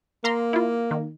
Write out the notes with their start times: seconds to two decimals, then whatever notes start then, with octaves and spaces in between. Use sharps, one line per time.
0.24 A#3 F5 A#5 C6
0.53 E4 F4
0.91 D#3